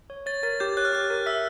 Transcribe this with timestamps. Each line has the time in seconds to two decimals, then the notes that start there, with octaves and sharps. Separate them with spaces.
0.10 C#5
0.26 C#5 A6
0.43 A#4 A6
0.60 G4 G6
0.77 C#5 F#6
0.85 F6
0.93 G4 F#6
1.10 A#4
1.26 E5 E6